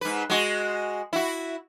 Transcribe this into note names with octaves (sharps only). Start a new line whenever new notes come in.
G#2 B4
G#3 F#4
E4 F#4